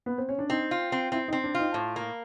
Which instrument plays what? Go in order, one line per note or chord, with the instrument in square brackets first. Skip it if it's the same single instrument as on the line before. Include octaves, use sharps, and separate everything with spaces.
[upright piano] B3
C4
C#4
D4
[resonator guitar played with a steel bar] C4 [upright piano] D#4
[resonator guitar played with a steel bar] F4
C4
[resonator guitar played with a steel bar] C4 [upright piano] E4
[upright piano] D#4
[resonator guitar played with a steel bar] C4
[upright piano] D4
[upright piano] D#4 [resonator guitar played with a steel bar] F4
[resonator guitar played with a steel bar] A2
A#3